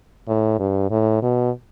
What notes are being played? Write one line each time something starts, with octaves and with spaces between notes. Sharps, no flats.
A2
G2
A2
B2